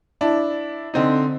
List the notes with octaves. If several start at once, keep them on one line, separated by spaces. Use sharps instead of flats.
D4 E4
D3 C4 D#4